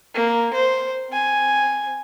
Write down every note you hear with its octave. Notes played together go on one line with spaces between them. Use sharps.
A#3
C5
C4 G#5